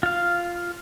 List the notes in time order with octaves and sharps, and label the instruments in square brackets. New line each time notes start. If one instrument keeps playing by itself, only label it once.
[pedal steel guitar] F4 F5